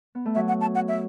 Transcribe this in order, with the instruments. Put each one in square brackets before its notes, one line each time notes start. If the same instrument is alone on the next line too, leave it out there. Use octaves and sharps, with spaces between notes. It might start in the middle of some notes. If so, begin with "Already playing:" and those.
[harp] B3
A3
[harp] F#3 [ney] E5
[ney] F#5
A5
F#5
E5